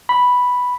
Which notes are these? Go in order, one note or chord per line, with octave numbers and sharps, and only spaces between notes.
B5